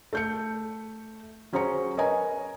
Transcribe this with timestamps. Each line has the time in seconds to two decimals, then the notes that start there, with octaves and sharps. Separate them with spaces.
0.13 A3 G6 C#7
1.53 F#3 C#4 G#4 C5 A#5 C#7
1.97 A#4 B4 C#5 D#5 G#5 A#5